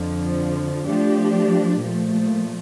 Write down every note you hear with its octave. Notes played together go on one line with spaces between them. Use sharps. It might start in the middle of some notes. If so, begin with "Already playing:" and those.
Already playing: F2 D3 F3
F3 A3 D4 G4
A#2 F3 A3